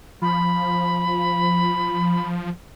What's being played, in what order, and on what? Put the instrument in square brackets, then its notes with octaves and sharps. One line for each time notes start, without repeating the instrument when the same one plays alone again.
[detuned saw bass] F3 [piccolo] B5